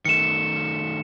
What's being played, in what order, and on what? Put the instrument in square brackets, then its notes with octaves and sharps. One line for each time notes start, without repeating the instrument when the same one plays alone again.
[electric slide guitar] D#3 A3 [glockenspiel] C#7 E7